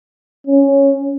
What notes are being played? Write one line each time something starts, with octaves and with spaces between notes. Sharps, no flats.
C#4